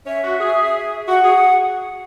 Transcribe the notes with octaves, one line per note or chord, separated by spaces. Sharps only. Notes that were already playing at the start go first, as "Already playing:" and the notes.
C#4 E5
F#4
G#4
F#4 F#5
G#4